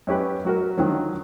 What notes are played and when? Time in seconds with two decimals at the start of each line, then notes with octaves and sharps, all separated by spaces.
0.07 F#2 C#4 G4 B4
0.45 F#3 F#4 A#4
0.78 D3 D#3 F3 F#3